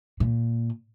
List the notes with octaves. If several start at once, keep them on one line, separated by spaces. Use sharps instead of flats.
A#2